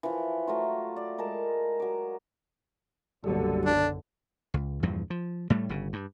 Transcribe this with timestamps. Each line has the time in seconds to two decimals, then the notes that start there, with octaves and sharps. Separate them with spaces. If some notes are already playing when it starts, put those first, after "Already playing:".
0.03 E3 F3
0.47 F#3 A3 F4
0.96 D5
1.18 G#3 A#4 D#5 A5
1.80 F#3 D6
3.24 F#1 B1 D3 F#3 G3 A4
3.66 D4
4.54 C#2
4.83 E2 G2 A#2 F3
5.10 F3
5.50 A2 G3 A3
5.69 G1 C#3
5.93 G2